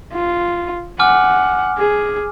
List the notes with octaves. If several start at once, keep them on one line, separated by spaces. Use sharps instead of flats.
F4
F#5 G#5 D6 F6
G#4